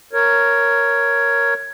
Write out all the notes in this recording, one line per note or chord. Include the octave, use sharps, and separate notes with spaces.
A#4 C#5